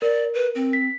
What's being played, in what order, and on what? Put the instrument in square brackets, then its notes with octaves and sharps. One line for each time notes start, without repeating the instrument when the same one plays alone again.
[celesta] A#4 [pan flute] D5
[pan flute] B4
C4
[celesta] B6